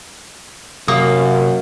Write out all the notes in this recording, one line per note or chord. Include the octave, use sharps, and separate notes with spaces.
F#2 C3 A#3 F5 D#6